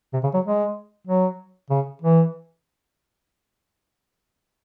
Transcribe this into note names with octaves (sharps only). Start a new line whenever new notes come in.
C3
C#3
F#3
G#3
F#3
C#3
E3